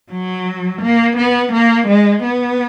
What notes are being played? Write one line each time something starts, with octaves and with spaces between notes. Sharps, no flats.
F#3
A#3
B3
A#3
G#3
B3